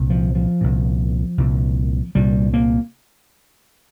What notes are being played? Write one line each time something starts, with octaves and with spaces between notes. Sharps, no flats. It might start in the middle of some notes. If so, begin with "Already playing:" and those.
Already playing: C2 A#2
F3
F3
C2 A#2
C2 A#2
C2 A#2 G3
A#3